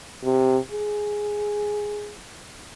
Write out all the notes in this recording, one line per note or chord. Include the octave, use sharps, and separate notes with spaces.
C3
G#4